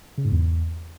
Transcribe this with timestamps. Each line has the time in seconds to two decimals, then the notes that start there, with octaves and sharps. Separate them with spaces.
0.18 C#3
0.25 G#2
0.32 E2